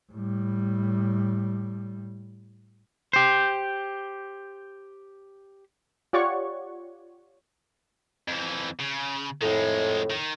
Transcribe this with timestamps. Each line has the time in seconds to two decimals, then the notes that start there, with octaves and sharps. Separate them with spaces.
0.12 A2 G3
3.13 G4 C5
6.13 F4 G4 C#5 D5 F#5 C#6
8.28 F2 E3
8.80 C#3
9.42 F2 A2 D#3 G#3
10.10 D#3